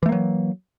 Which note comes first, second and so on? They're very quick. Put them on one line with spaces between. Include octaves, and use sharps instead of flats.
E3 A3 A#3 F#3